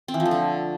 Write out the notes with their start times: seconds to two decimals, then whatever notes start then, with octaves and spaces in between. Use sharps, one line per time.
0.08 C4
0.14 E3
0.20 F3
0.26 A3
0.31 D3